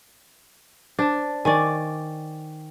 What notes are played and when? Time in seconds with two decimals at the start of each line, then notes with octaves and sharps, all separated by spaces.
0.99 D4 C5 A5
1.45 D#3 D5 G#5 C#6 D6